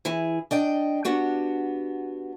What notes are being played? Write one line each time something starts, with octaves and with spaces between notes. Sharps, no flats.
E3 E4 G#4
D4 D#5 G5
B3 D4 F#4 G4